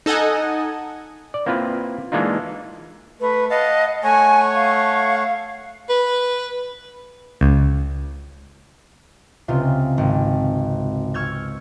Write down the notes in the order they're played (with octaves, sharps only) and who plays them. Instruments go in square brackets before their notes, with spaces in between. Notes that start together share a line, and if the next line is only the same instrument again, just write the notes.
[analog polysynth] D#4 A4 D#5 F#5 G#5
[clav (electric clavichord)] D5
A#3 C4 E4 F4 B4
E3 G#3 A#3 D4 D#4 F4
[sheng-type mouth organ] A3 [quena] B4
[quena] D#5 [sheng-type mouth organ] F5 F#5 A5
[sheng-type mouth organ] A3 C#5 F#5 [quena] G#5
[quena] F5
[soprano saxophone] B4
[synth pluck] C#2
[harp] C#2 C3 F4
G#1
C#6 E6 F6 G6 G#6